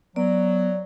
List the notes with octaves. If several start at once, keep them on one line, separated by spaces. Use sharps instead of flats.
F#3 B3 D5